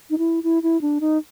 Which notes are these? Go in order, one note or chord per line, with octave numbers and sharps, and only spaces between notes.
D#4
E4
E4
E4
D4
D#4